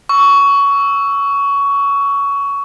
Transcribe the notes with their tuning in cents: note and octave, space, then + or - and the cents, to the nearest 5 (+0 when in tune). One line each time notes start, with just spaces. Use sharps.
C#6 +15 E6 +0